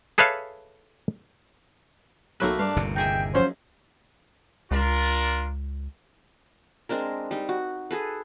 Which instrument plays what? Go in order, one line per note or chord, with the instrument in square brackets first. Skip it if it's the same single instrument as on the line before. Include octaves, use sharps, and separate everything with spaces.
[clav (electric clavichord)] G#4 A4 B4 C#5 E5 F5
[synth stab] B1 F#3 E6 [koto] A3 A#3 B4
[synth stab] G2 [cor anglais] D4 [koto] F5
[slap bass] G1 D#2 C3
[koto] D#4 G#4 E5 [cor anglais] G5
[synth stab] F3 F#3 C#4 [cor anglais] C5
[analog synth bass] C#2 [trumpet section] D4 F4 A#4
[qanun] G#3 C4 D4 A#4
G3 D#4
F#4
G#4 A4 B4